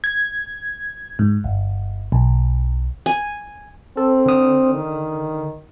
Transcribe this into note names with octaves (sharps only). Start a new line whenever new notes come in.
G#6
G#2
G1
B1
G#5
C4 A4
D3 D#6
D#3